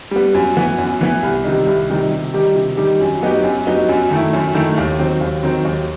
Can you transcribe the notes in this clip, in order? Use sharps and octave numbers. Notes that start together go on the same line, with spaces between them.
G3 B3
F#2
E3 B3
F#2
E3 B3
C2
C3 D#3 G3 D#4
C2
C3 D#3 G3 D#4
C3
D#3 G3 D#4 G4
C3
D#3 G3 D#4 G4
F#2
F#3 B3 D#4 G4
F#2
F#3 B3 D#4 G4
F#2
D#3 A3 E4
F#2
D#3 A3 E4
D#2
D#3 F#3 C4
D#2
D#3 F#3 C4
D#2